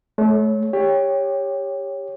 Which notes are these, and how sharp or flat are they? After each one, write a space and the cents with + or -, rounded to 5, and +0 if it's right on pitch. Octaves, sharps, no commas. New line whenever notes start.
A3 -35 C#5 +0
G4 +20 C#5 +0